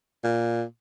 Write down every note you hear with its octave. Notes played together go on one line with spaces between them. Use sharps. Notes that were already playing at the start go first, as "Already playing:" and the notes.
A#2